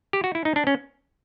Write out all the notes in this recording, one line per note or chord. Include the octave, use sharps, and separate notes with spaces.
G4
F#4
E4
D#4
D4
C#4